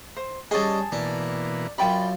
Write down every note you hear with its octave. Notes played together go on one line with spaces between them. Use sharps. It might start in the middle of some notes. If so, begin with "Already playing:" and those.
C5
G3 C#4 G#4 D#5 G#5 A5
B2 E3 A#3 D4
F#2 F4 D5 G5 B5